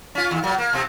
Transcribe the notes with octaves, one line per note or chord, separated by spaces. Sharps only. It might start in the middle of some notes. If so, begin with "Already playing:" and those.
C#4 F4
D#2
A#2 F#3
A#3
B2 C4